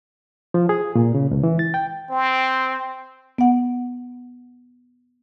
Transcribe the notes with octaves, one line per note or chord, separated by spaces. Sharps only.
F3
G#4
A#2
C#3
C#2
E3
A6
G5
C4
B3 F#5